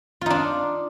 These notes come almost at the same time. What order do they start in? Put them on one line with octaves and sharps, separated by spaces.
F4 D#4 D4